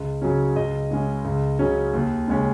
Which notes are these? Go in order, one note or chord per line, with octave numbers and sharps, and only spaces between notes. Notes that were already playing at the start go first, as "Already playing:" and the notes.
Already playing: C#2
C#3 F#3 C#4
C#2 D#5
C#3 G#3 C#4
C#2
C#3 F#3 C#4
D#2
C#3 G#3 C#4